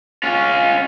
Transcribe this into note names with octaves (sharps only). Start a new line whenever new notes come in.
C#4 F4